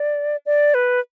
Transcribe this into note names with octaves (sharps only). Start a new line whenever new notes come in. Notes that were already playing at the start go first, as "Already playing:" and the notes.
Already playing: D5
D5
B4